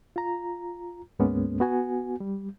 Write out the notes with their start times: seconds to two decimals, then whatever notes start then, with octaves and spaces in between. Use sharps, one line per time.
0.16 F4 A#5
1.19 D2 G#2 G#3 A#3 B3 C#4
1.60 B3 F#4 G#5
2.20 G3